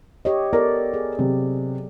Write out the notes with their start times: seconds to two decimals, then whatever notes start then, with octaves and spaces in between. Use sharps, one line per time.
0.25 G4 C#5 D#5
0.53 B3 A4 A#4 D5
0.94 G#4
1.19 C3 F#3